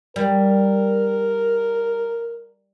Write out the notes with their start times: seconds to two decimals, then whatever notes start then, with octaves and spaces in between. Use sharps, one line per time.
0.16 G3 A#4